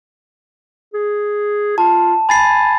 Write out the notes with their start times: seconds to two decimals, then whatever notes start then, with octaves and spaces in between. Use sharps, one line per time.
0.94 G#4
1.78 F4 A5
2.29 G#5 B5 A6 C7